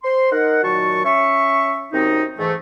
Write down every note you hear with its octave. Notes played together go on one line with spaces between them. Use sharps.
C5 C6
D#4 A#4 F#5
A#2 D#3 F#3 F#4 A5 C#6
C#4 E5 C#6
F#2 C3 C4 D#4
G#2 E3 A3